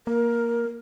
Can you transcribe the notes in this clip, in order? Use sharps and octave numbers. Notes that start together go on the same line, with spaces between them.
A#3 A#4